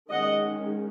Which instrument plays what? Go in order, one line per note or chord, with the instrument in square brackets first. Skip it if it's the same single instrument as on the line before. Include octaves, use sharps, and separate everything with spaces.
[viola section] D#3 G#3 C#4 D#5 F#5